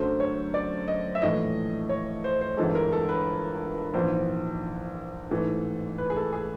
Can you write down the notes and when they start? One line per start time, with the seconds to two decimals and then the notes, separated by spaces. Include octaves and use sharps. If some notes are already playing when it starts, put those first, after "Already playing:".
Already playing: F#2 D3 F#3 A3 C5
0.20 C#5
0.54 D5
0.88 D#5
1.15 E5
1.22 A#1 A2 E3 A3 D#5
1.89 C#5
2.24 C5
2.41 C5
2.57 G1 G2 E3 G#3 A4
2.75 A#4
2.92 A4
3.09 B4
3.94 A#1 G#2 E3 C5
5.30 A1 G#2 E3 A3
5.98 B4
6.10 G#4
6.16 A4
6.33 G#4